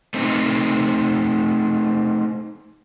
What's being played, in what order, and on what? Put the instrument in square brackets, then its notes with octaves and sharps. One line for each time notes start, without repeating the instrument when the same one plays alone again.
[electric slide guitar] A3 C4 D#4